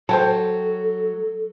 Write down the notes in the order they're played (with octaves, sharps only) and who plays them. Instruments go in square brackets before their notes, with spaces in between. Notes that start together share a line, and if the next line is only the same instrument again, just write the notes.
[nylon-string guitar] F#3 [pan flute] A4 [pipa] C5 G5 A5